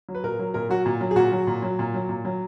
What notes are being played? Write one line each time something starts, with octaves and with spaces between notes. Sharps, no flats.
F#3
B4
A#2 A#4
F#3
A#2 A#4
F#3 F#4
A#2
F#3
G#4
A#2 F#4
F#3
A#2
F#3
A#2
F#3
A#2
F#3